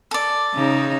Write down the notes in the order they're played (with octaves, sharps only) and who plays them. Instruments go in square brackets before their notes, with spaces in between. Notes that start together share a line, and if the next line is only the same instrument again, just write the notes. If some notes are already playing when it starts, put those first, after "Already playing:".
[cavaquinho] A4 D5
[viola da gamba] C#3 D#4